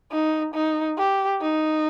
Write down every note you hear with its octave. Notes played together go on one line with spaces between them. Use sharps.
D#4
D#4
G4
D#4